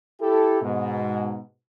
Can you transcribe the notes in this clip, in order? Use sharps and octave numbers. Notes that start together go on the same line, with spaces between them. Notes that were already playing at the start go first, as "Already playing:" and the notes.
E4 G4 A4
G#2 B2